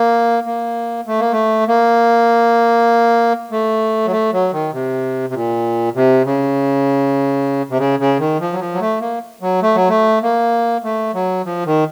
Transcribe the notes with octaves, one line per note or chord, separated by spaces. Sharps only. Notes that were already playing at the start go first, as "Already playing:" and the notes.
Already playing: A#3
A#3
A3
A#3
A3
A#3
A3
F#3
A3
F#3
D#3
C3
C3
A#2
C3
C#3
C3
C#3
C#3
D#3
F3
F#3
F3
F#3
A3
A#3
F#3
A3
F#3
A3
A#3
A3
F#3
F3
D#3